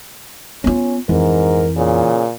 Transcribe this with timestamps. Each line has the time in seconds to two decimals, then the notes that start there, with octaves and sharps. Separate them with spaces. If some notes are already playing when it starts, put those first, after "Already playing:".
0.64 B3 C#4 F4
1.09 F2 G#2 E3 A#4
1.77 A#2 C#3